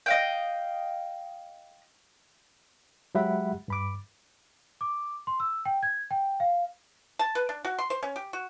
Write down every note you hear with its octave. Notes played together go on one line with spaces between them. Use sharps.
D#5 F5 G5
F#3 G#3 G4 E5 F#5 B5
G2 B5 D6
D6
C6
E6
G5
G#6
G5
F5
A5
B4
D4
F#4
C6
C5
C#4
G4
F#4